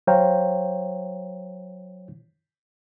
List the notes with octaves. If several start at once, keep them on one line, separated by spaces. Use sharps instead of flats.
F#3 C5 C#5 F5 G5 A#5